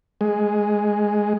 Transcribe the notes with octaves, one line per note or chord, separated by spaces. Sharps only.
G#3